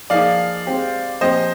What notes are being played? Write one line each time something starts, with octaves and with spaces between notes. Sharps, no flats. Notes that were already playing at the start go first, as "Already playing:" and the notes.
F3 A#3 D#4 G#4 D5 F5
G#3 C4 G4
A#2 F3 C4 G4 C5 D#5